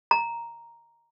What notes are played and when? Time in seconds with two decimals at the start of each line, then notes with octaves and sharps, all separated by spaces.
0.11 A#5